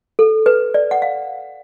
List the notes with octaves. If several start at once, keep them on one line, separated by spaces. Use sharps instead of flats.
A4
B4
D5
F#5
F5